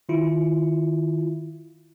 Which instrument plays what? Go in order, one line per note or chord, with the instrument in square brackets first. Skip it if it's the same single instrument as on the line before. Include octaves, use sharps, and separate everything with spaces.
[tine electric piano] D#3 E4 F4